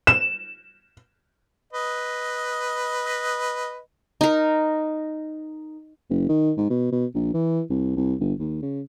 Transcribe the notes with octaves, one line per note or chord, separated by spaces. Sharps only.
E7
B4 D#5
D#4 A#4
F#1
D#3
G#2
B2
B2
A#1
E3
C2
C2
G1
D#2
C#3